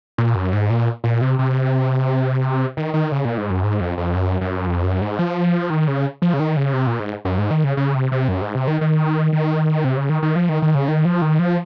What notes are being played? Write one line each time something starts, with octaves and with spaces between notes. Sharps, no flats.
A#2
F#2
G#2
A#2
A#2
C3
C3
D#3
D#3
C#3
A#2
G#2
F#2
G#2
F2
F2
F#2
F#2
F2
F#2
G#2
F3
D#3
C#3
F3
C#3
D#3
C#3
C3
A#2
G#2
F#2
G#2
D#3
C#3
C#3
C3
C3
F#2
G#2
C3
D#3
D#3
D#3
C3
C#3
D#3
D#3
F3
D#3
D#3
C#3
D#3
F3
D#3
F3